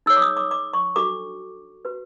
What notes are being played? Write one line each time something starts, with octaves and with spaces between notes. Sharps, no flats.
D#4 G#4 C#5 E6
D6
D#6
D6
D6
C#6
D4 F#4 A4 D6
F#4 B4